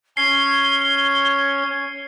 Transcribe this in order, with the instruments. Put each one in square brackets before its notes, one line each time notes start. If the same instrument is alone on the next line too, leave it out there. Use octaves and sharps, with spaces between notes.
[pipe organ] C#4 C#5 G#6 [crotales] C7 [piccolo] G7